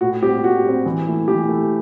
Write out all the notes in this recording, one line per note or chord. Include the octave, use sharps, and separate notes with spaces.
A2 F#4
G3 C4 G4
A2 F#4
G3 C4
E3
A3 E4
E3 G4
A3 E4